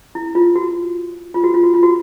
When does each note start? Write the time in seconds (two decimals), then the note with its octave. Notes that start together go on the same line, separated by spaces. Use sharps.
0.15 E4
0.35 F4
0.56 F#4
1.34 F4
1.44 F#4
1.54 F4
1.63 F#4
1.74 F4
1.83 F#4